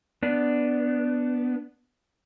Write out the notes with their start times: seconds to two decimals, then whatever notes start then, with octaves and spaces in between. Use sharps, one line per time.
0.23 B3 D4